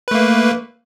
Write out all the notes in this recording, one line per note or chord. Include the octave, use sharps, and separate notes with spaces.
A3 A#3 B4